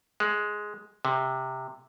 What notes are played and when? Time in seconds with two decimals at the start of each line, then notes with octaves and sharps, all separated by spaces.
0.20 G#3
1.05 C3